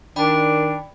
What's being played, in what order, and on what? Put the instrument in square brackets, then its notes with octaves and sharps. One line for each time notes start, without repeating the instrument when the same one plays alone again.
[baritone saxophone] D#3 [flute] D4 [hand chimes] D5 G5 B5